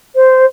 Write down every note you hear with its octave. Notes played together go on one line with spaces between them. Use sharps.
C5